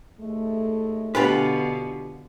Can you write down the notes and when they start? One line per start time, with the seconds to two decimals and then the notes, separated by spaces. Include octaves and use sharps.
0.21 D#2 G#3 A3
1.15 B2 D3 D4 F4 G4 B4 G#5